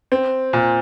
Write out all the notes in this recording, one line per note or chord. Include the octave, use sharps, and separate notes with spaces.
C4
A#2